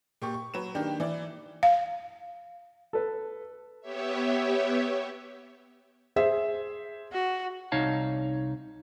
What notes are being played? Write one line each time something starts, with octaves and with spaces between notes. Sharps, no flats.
A#2 G4 C#6
C#6
F#3 B4 E7
D#3 A#3 D4 G4
E3 D5
F5
A4 B4
B3 G4 C#5 E5
G#4 C5 E5
F#4
C2 D#4 C#5 F5 A5